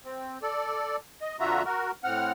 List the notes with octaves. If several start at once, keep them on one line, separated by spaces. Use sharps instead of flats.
C4
A4 D5
D#5
F2 D3 F4 F#4 E5 A#5
F#4 A#4
A2 C4 F#5 F6